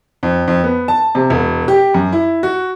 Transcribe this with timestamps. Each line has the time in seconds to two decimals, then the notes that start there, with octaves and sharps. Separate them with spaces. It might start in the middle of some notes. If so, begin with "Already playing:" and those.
0.23 F2
0.48 F2
0.64 B3
0.88 A5
1.15 C3
1.30 E1
1.68 G4
1.94 F#2
2.12 E4
2.43 F#4